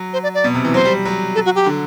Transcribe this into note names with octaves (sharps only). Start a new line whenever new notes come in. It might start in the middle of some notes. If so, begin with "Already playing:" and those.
Already playing: F#3
C5
D5
D5
B2
C3
E3
F#3 C5
G3
F#3
A4
F#4
G4
D3